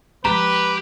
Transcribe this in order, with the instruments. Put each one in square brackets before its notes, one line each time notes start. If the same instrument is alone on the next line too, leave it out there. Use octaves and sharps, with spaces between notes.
[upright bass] F3 G#3 [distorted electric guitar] G4 [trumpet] B4 [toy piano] A#5